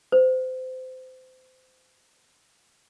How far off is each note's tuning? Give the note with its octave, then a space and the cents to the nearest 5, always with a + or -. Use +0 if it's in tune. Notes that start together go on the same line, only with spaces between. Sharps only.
C5 -25